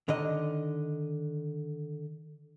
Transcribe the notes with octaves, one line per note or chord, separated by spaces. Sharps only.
D3 D#3 D#5